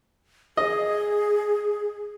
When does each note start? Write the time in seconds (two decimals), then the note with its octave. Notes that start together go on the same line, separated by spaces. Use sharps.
0.57 G#4 D#5